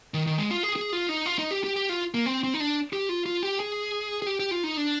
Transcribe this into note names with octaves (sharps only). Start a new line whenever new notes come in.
D#3
D#3
G#3
F4
G#4
G#4
F4
D#4
F4
D#4
G4
G4
G4
F4
A#3
C4
C4
D#4
D4
G4
F4
F4
G4
G#4
G#4
G4
G4
F4
D#4
D4